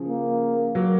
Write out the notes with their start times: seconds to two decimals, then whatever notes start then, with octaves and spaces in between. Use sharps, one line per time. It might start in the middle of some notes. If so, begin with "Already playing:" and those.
Already playing: C#3 F3
0.08 A#3
0.75 F#3 A#3